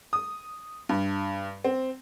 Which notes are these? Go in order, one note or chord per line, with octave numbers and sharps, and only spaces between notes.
D#6
G2
C4